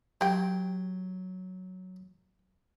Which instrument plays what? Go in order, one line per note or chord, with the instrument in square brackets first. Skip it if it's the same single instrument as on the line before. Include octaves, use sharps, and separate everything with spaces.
[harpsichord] F#3 [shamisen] G4 G5